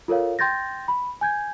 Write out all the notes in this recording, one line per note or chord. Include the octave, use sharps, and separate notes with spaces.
F4 A4 A#4 C#5 F5
G5 C6 G6 A6 A#6
B5
G#5 G6 G#6